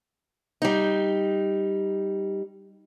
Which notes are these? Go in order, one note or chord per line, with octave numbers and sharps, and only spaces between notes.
G3 D#4